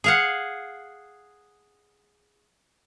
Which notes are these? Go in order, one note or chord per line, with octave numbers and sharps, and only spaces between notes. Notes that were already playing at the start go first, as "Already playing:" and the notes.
G#4 F5 F#5